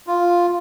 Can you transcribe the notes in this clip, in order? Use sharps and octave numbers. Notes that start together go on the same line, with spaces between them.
F4